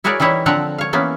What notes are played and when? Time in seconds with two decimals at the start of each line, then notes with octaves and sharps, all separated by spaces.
0.04 E4 F#4 G#4 A#4 C#5 D5
0.20 E3 G3 D#4 E4 C#5
0.46 D3 F3 C4 E5 F#5 A#5
0.78 C#5 F5
0.93 E3 A#3 B3 C#4